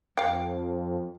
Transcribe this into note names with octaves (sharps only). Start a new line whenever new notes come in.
F2 F5 G5